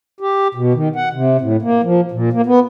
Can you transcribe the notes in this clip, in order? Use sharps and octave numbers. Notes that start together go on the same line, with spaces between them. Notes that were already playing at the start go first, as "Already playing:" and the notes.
G4
B2
D#3
F#5
C3
A2
A#3
F3
A#2
A#3
B3